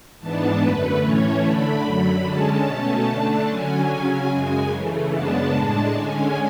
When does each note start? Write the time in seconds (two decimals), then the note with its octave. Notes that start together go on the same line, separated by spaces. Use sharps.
0.19 G#2 E3 B3 D4 A5
0.60 F#2 D3 A3 B4
1.02 A2 E3 A3 C#4 C#5
1.43 D3 A3 D4 B5
1.84 F#2 D3 F#3
2.25 D3 G#3 C#4 A5
2.65 B2 A3 C#4
3.07 D3 A3 D4
3.48 D3 F#3 C#4 G#5
3.89 C#3 F#3 C#4
4.29 F#2 C#3 G#3
4.71 C#3 E3 A3
5.11 F#2 C#3 G#3 B3 D4 A5
5.53 A2 G#3 D4
5.94 D3 G#3 C#4 G#5